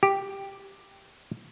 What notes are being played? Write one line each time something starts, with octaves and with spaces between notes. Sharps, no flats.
G4